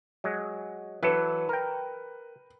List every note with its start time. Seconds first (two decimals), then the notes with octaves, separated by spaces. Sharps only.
0.24 F#3 G#3
1.03 E3 F#3 A4 B4
1.49 A#4 G5